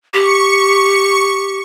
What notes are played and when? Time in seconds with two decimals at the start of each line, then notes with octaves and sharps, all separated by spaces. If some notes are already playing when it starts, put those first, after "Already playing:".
0.14 G4 C#6 C#7